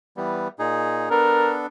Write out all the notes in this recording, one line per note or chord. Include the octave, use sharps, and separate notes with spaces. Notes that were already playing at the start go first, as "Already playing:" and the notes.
E3 G3 B3
A#2 D#4 G#4
B3 D4 A4 A#4